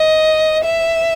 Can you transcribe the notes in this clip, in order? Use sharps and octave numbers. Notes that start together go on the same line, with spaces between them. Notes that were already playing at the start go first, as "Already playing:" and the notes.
Already playing: D#5
E5